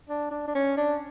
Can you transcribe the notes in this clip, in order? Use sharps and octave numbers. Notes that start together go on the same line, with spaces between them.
D4
D4
D4
C#4
D4